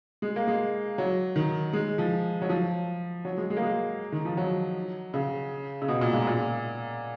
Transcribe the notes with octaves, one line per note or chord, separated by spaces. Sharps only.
G#3
A#3
G#3
F#3
D#3
G#3
F3
F#3
F3
F#3
G#3
G#3
A#3
G#3
D#3
F3
F#3
C#3
C#3
B2
A#2
G#2
A#2